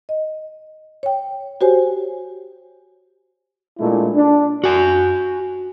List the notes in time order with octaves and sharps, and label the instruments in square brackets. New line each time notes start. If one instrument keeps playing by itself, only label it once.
[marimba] D#5
C#5 G5
F#4 G4 C5 C#5 G#5
[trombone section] A#2 G#3 A3 D4 E4
D4
[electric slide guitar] F#4 G#5